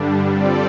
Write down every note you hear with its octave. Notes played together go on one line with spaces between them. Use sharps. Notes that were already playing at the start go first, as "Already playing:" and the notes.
Already playing: G2 D3 G3 D4
G3 C4 F4 A4 D5